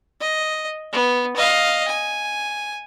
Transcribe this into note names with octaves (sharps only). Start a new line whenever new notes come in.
D#5
B3
D#5 F5
G#5